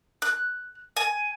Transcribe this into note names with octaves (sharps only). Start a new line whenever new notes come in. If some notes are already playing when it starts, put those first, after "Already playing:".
F#6
G#5